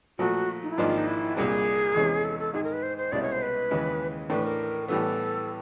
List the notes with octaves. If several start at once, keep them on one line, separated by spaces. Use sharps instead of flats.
A#2 F3 A3 F#4
D#4
E4
G#1 G#2 F3 A#3 D4 F4
D#4
E4
C2 A#2 G3 A#3 D4 G#4
E2 C3 E3 G#3 C#4
A4
A4
G#2 D#3 G#3 G#4
A#4
B4
C5
C5
C2 B2 G#3 C#4 E4 D5
C#5
C5
B4
D#2 C#3 E3 G#3
A2 E3 A3 D4 B4
A#4
A2 E3 G3 B3 A4